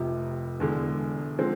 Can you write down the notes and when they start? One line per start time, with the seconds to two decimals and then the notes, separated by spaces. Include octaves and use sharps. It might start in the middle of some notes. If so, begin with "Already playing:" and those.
Already playing: F1 F2 C3 F3
0.60 E1 E2 D3 G#3
1.39 D3 F3 G#3 C4